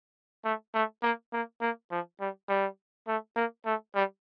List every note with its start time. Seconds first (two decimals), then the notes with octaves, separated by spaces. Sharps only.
0.44 A3
0.74 A3
1.02 A#3
1.33 A#3
1.61 A#3
1.91 F3
2.21 G3
2.49 G3
3.08 A3
3.36 A#3
3.66 A3
3.95 G3